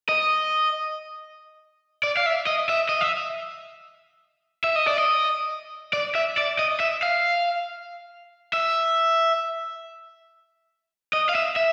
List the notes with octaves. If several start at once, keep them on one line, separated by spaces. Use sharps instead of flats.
D#5
D5
F5
E5
D#5
E5
D#5
E5
E5
D#5
D5
D#5
D5
E5
D5
D#5
E5
F5
E5
D#5
F5
E5
E5